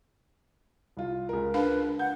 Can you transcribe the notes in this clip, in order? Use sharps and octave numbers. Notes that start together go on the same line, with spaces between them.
C2 F4
C#2 A#4
D4 B4 F5 B5
F#5 G6